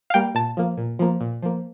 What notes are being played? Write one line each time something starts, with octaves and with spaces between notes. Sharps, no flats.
F5
G3 A#3 G5
A#2 A5
F3 A#3
A#2
F3 A#3
A#2
F3 A#3